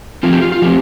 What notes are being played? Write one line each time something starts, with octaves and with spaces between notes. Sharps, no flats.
F3 A3 C4 F4
G4
F4
F4
F3 A3 C4 G4